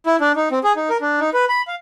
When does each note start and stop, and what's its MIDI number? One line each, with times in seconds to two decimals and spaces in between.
0.06 0.16 64
0.21 0.32 62
0.36 0.49 63
0.51 0.59 60
0.64 0.73 68
0.76 0.89 63
0.89 0.97 70
1.01 1.20 62
1.20 1.30 63
1.34 1.45 71
1.49 1.62 83
1.68 1.75 77